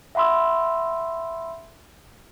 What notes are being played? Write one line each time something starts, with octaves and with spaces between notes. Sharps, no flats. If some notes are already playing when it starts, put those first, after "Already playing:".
E5 F#5 B5 C6 E6